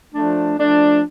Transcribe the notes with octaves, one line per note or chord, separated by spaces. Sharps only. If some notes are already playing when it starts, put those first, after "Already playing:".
F3 A3 D4
F3 A3 D4